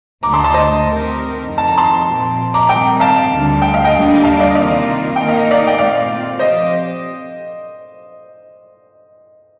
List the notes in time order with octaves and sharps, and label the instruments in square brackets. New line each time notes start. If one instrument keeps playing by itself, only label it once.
[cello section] D2 D3 A3 [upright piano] A#5 D6
[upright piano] A5 C6
A5 C6
C5 D#5
[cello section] D#3 A3 C4 G4 A#4
F2 C3 D#3
[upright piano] A5
A#5
A5 C6
[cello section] A#2 F3 C4
[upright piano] A#5 D6
[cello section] D#3 G3 C4 [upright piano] G5 A#5
[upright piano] F5 A5
[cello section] D2 D3 G3
[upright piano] G5
F5
D#5 G5
[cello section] D#2 D3 G3 D4
[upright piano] F5 A5
D5 F5
D#5
[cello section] C3 D#3 A#3 F4 [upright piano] D5 F5
[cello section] D#3 A#3 D#4 A#4 [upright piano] G5
[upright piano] F5
D#5
D5 F5
G5
[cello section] A#2 A3 C4 F4 [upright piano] D5 F5
[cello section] F3 C4 G4 [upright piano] C5 D#5